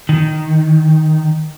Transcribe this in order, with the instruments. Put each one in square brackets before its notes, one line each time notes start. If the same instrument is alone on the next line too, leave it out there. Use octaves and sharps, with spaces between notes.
[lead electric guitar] D#3